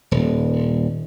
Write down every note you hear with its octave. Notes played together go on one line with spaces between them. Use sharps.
D#1